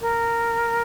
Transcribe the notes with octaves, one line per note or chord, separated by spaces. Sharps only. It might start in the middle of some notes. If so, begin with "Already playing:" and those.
A#4